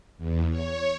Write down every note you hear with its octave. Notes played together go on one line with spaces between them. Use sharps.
E2
C#5